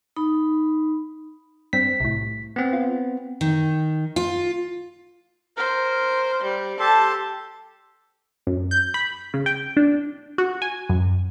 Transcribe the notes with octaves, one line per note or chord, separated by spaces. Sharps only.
D#4 B5
G2 C4 B6
C2 A2
B3 C4
F4
D#3
F4
A#4 C5
G3
G4 A4 A5 C6
F#2
G6
B5
C#3
G5
D4
F#4
G#5
F#2